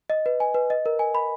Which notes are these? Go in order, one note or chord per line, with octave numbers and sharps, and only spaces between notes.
D#5
B4
G#5
B4
D#5
A#4
G#5
B5